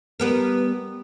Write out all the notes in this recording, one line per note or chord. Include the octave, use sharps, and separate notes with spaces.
G3 B3 A#4